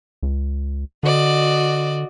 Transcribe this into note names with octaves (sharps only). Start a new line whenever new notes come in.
C#2
D3 F#4 D5 D#5